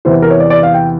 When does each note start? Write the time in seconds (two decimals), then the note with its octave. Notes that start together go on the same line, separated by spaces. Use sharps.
0.05 E2 C3 E3 C5
0.13 B4
0.22 A#4
0.30 C#5
0.40 D5
0.50 D5
0.63 F5
0.74 G5